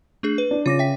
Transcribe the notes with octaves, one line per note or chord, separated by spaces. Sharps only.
A3 D4 G#4
B4
D4
C#3 F4 D6 A#6
E5 G5 B6